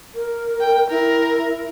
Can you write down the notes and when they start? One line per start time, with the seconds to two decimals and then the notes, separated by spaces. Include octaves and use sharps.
0.15 A#4
0.61 G5
0.90 E4 A#4